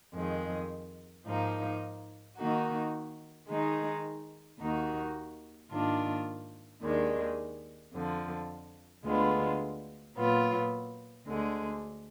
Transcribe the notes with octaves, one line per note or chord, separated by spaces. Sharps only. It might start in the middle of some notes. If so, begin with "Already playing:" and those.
F2 D#3 G#3
G#2 F3 A#3 D#4
D#3 A#3 D#4 F#4
D#3 G#3 D#4 G#4
D#2 D#3 A#3 D#4 F#4
G#2 D#3 A#3 D4 F4
D#2 D#3 G#3 D4
F2 D3 F3
D2 D3 G#3 B3 F4
A#2 F#3 B3 F4
D2 D3 G#3